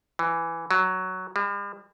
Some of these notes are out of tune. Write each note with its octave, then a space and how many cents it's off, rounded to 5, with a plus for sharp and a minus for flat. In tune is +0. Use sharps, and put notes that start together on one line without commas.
E3 +10
F#3 +5
G3 +45